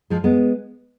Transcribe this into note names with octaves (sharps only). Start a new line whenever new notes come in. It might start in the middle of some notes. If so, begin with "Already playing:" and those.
F3 G#3
G#3 B3